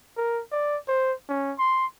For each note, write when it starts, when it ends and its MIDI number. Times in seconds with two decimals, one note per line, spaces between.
0.17 0.41 70
0.52 0.77 74
0.88 1.13 72
1.29 1.53 61
1.59 1.86 84